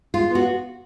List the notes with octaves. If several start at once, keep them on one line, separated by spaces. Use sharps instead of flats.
G#3 F4
B3 F#4